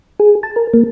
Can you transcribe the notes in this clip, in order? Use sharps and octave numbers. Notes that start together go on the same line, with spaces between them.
G#4
A5
A#4
A#3